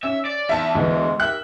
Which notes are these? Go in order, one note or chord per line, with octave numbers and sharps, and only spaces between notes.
C#4 E5
D5
E2 E5 A5
D2 E3 G#3
G4 A#4 E5 F#6